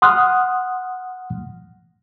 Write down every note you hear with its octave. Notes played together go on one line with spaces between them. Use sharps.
F#5 C6 D#6 F6 F#6